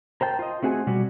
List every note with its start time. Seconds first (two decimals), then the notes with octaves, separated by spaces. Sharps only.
0.21 A#4 C5 G5 A5
0.39 F4 D#5
0.63 A3 C4 F#4 G#4 G#5
0.87 B2 G3 F#4